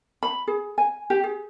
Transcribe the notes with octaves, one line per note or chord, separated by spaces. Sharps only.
B5
G#4
G#5
G4
G#4